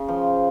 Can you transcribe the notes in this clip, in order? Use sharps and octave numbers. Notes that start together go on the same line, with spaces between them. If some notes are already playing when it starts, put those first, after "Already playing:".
Already playing: C#3
F3